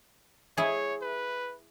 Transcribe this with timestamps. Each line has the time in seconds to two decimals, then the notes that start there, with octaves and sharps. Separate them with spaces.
0.57 E4 G#4 C#5
1.02 B4